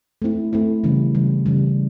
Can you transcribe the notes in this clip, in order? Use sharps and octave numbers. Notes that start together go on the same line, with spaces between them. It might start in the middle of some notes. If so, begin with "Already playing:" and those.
A3 C4 E4
A3 C4 E4
C#3 E3 G3
C#3 E3 G3
C#3 E3 G3